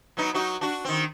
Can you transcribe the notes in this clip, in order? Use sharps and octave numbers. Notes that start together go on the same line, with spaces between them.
F#3 B3 D#4
F#3 D#4 F#4
D4 F#4
D#3 C4